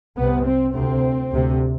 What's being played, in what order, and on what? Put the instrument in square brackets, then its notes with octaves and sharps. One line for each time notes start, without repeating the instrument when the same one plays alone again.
[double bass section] C2 C3 B3
C4
D2 C3 C4
D2 C3